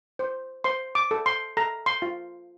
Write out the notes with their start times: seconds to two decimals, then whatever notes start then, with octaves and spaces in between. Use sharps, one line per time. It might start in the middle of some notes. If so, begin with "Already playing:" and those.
0.19 C5
0.64 C5 C6
0.95 D6
1.11 A4
1.26 C6
1.57 A4 A#5
1.86 C6
2.02 F4